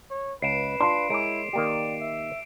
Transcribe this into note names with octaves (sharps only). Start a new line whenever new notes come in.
C#5
C#2 B4 C7 D7 E7
D4 F4 C6
G#3 E4 A#4 C#5 D6 D7
D#3 A#3 G4 D5
E5